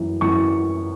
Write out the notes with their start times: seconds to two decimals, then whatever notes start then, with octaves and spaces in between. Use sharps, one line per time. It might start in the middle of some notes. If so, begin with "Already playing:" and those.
Already playing: F#2 E3
0.21 F#2 E3 C#6